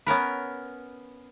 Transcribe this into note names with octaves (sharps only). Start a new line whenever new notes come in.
B3 C#4 A#4 B4